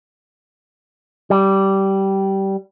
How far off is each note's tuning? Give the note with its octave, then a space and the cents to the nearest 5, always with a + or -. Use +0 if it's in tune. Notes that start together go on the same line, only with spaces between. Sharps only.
G3 -15